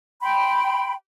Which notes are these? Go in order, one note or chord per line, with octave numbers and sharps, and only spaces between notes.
G5 B5 C6